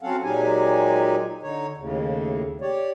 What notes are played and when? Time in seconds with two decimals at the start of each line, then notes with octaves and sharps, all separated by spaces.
0.03 F#3 C4 C#4 A4 F5 F#5
0.23 A#2 F#3 G#3 D#4 G4 G#5
1.43 D3 D#4 C#5
1.77 D#2 A2 C#3
2.61 G4 C#5 D5